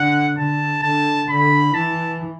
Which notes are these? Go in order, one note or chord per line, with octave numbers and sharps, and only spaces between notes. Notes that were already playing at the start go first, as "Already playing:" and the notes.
Already playing: D3 F#5
D3 A5
D3 A5
D3 B5
E3 A5